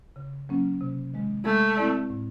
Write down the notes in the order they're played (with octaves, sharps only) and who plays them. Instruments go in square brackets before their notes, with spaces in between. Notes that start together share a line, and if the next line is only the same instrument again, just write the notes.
[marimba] C#3
F#3 A#3 C#4
C3
D#3 G#3
[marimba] G#3 [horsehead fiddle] A3
[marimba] C4 E4 A4 D5
A2